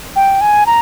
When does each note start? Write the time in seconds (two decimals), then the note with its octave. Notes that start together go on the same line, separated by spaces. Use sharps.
0.16 G5
0.41 G#5
0.67 A#5